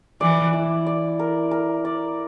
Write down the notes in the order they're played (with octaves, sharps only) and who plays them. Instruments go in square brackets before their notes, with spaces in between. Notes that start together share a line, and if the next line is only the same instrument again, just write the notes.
[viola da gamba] E3 [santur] D5
[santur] E4
D5
A#4
A#4
D5